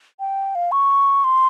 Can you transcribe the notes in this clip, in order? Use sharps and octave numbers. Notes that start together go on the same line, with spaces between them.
G5
F5
C#6
C6